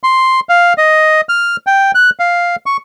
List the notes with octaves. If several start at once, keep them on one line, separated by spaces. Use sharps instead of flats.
C6
F5
D#5
F6
G5
F#6
F5
C#6